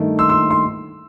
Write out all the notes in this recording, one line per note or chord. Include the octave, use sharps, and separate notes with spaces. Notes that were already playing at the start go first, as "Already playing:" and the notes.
Already playing: G2 D#3 A3
C6 E6
C6 E6
C6